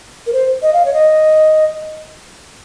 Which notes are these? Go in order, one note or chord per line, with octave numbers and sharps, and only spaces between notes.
A#4
C5
D#5
F5
C#5
D#5